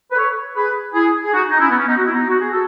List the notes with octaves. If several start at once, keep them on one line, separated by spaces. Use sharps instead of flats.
B4
A4 C#5
G#4 B4
E4 G#4
G#4
D#4 F#4
D#4
C#4 E4
B3
C#4
B3 D#4
F#4
E4
B3 D#4
F#4
G#4
F#4 A4